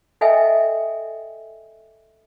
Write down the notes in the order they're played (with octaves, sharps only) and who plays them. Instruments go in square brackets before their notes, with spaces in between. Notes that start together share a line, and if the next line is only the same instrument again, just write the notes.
[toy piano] A4 D#5 E5 G5 G#5